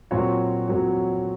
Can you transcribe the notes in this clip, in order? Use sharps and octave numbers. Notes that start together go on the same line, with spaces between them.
A#2 F#3 C4 F#4 C#5
A#2 F#3 C4 F#4 C#5